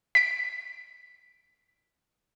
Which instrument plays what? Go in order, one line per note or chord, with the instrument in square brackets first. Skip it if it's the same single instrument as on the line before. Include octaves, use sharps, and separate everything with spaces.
[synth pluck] B6 D7